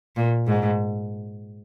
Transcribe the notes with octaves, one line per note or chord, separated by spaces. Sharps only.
A#2
G#2